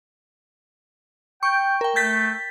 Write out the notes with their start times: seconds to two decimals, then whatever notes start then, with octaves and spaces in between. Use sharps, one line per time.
1.43 G5 C#6
1.81 A#4 G5
1.96 A3 G6 A6 B6